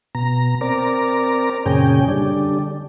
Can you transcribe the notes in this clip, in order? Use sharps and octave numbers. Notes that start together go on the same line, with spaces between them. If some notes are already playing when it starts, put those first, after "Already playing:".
B2 A#5
C4 A#4 D5 A#5
F#2 A#2 C#3 C#4 G#4 G5
D3 G3 D4